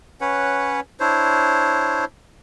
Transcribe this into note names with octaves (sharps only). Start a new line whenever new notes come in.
C#4 B4 C#5 F#5
D4 E4 C5 C#5